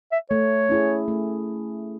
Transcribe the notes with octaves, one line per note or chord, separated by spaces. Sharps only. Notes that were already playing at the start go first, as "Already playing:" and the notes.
E5
A3 C#5
C#4 E4 G#4
A3